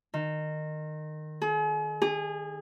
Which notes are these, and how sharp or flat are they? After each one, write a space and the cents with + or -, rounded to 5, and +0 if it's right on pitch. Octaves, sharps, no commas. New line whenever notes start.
D#3 -20
G#4 +40
G#4 -30